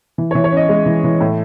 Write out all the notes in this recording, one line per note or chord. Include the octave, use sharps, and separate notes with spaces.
E3
E3 C#5
C#5
C#4 D#5
G#3
E3
E3
A2